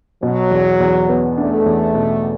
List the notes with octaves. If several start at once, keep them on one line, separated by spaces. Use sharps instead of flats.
B2 F#3
E2
E2
B3
A3 D4
E2
B2